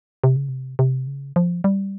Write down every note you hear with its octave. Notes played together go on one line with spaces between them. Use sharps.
C3
C#3
C3
C3
C#3
F3
G3